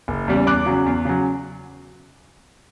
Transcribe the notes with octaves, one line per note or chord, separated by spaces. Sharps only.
F#1
E2 C#3 G3
E2 D6 F#6
C#3 F#3
E2
C#3 F#3